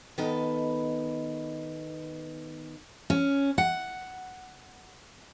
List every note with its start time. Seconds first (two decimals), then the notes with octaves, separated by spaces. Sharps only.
0.18 D#3 B3 A4 B4 D#5
3.10 C#4
3.58 F#5